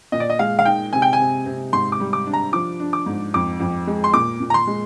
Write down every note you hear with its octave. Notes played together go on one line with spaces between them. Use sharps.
A#2 D#5
D5
D#5
G#3 F5
F5
D#4 G5
C3 G#5
G5
G#5
C3
C3
G#2 C6
D6
G3
D6
D4
A#5
F3 D6
D4
D6
G#2
F2 D6
F2
G#3
C6
A#2 D6
A#2
A#5
C6
G#3